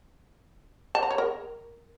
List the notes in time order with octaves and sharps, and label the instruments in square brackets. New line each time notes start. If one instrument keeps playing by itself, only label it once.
[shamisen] A5
A#5
C#5
A#4